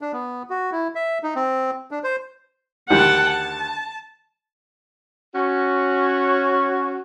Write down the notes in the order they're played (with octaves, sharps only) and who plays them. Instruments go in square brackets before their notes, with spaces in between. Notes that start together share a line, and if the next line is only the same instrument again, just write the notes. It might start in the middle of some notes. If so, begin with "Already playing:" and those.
[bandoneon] D4
B3
F#4
E4
E5
D#4
C4
D4
C5
[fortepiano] D2 D#3 G3 [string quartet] F#5 G5 A5
[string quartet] A5
[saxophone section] C#4 F#4